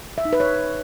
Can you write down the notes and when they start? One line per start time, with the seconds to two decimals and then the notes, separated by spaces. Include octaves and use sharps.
0.18 E5
0.25 D#4
0.33 B4
0.40 C#5